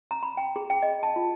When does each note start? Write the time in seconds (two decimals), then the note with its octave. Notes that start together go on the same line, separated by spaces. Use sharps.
0.11 A#5
0.23 B5
0.37 G5
0.56 G#4
0.70 G5
0.82 D#5
1.03 A5
1.16 F4